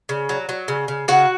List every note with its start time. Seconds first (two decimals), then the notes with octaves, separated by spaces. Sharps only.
0.09 C#3
0.29 F#3
0.49 F#3
0.68 C#3
0.88 C#3
1.08 C#3 F#4 F#5